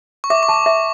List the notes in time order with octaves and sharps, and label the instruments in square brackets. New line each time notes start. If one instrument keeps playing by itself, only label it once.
[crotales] C#6
[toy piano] E5 [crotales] D6
[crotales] C#6
[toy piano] A5
[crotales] D6
[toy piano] E5